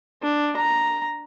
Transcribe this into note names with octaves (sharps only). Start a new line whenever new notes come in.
D4
A#5